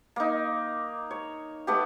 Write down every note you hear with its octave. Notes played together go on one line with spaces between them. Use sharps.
A#3 D#4
C#5
A3 B3 G4